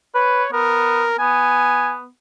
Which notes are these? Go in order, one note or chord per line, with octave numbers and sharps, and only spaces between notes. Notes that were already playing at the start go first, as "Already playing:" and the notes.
B4 C#5
B3 A#4
B3 G#5